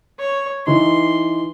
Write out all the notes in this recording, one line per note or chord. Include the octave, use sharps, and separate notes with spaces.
C#5
E3 D#4 C6